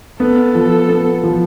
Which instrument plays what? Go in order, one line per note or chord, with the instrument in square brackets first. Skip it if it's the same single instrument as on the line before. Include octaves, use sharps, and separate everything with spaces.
[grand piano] B3 [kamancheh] A4
[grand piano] F3
B3
F3